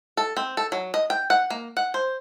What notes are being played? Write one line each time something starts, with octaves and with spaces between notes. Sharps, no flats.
A4
C4
A4
F#3
D#5
G5
F#5
A#3
F#5
C5